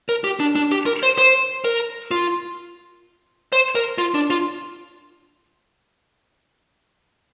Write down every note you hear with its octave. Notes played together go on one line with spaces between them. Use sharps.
A#4
G4
D4
D4
G4
A#4
C5
C5
A#4
F4
C5
A#4
F4
D4
F4